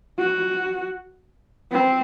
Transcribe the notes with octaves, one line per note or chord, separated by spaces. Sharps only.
F#4
C4